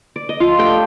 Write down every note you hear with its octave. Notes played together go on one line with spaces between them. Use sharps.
D5
D#5
F3 F4 F5
A3 D4 G4 G5